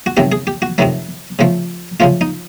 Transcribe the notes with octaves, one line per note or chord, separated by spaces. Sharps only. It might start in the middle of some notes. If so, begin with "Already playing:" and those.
F#4
F2 C3 D#3 F#3 A3 G4
G#4
G4
F#4
F2 C3 D#3 F#3 A3
C#3 F3 A3
C#3 F3 A3 F4
D#4